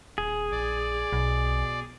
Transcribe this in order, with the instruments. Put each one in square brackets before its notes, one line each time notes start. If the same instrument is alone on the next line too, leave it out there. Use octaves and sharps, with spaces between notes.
[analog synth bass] D#1 [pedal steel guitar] G#4
[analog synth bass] A#1 [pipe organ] D5
[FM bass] B1 [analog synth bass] B2